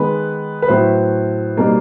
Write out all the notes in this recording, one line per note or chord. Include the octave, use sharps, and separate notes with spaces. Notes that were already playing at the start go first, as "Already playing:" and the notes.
Already playing: D#3 G#3 B3 B4
B4
A2 F#3 B3 E4 C5
B2 G3 A#3 D#4